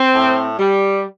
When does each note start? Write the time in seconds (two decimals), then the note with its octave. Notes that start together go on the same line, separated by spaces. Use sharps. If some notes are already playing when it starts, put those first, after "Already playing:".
Already playing: C4
0.15 A2
0.59 G3